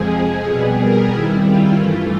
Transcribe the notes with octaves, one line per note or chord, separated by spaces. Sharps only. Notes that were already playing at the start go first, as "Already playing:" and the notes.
Already playing: F2 C3 F3 G#3 G#4
G#4
B2 G3 B3 G#4
A#4
C3 D#3 G3 E4
F4
G2 E3 A3 F4